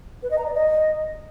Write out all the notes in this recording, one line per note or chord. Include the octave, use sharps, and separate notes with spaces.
B4
D#5
A#5
D5
D#5